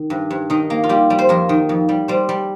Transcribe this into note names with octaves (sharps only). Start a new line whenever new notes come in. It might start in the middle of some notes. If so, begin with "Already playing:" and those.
Already playing: D#3
G2
G2
D#3 D#4
A#3
F4
G3 G4
G3
C5
F2 A#4
D#3
F2
G3
G3 C5
G3